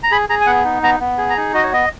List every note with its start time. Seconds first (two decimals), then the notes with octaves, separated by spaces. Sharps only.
0.03 A#5
0.11 G#4 B5
0.29 G#4 A#5
0.41 G#5
0.46 B3 F#5
0.65 D#4
0.83 B3 A#5
1.00 B3
1.18 G#4
1.30 A#5
1.37 D#4
1.54 F#4 D#5
1.64 C#5
1.72 B3 D#5